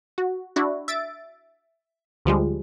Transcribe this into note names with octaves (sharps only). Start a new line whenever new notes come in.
F#4
D4 E4 F#4
E5 A6 D7
D2 F3 G3 G#3